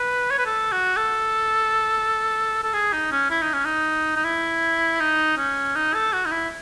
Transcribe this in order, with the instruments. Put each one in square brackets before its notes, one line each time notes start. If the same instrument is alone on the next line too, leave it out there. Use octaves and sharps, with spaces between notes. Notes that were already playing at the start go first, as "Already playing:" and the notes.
Already playing: [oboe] B4
C#5
B4
A4
F#4
A4
A4
G#4
D#4
C#4
E4
D#4
C#4
D#4
D#4
E4
D#4
C#4
D#4
A4
F#4
D#4
E4